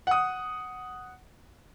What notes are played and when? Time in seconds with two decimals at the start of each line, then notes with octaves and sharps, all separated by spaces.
0.07 F#5 D#6